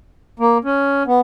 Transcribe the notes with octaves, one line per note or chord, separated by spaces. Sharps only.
A#3
C#4
B3